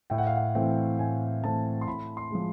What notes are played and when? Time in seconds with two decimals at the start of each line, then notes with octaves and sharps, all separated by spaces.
0.10 A2 G5
0.18 F#5
0.27 F5
0.36 F#5
0.55 E3 A3 C4 G5
0.99 A2 G#5
1.43 E3 A3 C4 A5
1.81 C6
1.87 A2 B5
2.17 C6
2.31 F3 G#3